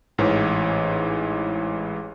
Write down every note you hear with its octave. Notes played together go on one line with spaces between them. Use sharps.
A1 G#2 E3 C#5